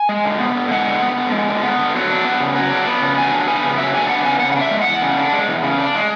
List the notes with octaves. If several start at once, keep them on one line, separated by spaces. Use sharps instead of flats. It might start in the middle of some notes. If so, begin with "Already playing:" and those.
Already playing: G#5
G#3
D3
B3
D3
G#3 F#5
D3
B3
D3
G#3
D3
B3
D3
F#3
D4
B3
C#3
F#3
D4
B3
C#3
F#3 G#5
D4
B3 G#5
C#3
F#3 E5
D4 G#5
B3 F#5
C#3 G#5
C#3 F#5
F#5
D4 E5
G#3
F#5
E2
C#3
D4
G#3
E2
C#3
D4
G#3